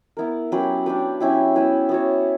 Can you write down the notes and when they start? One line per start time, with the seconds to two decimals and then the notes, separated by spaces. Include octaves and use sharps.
0.17 B3 E4 A#4
0.52 F#3 C#4 G4 B4
0.86 D4 G4 B4
1.20 F#3 C#4 E4 G4
1.55 B3 E4 B4
1.89 B3 F#4 C#5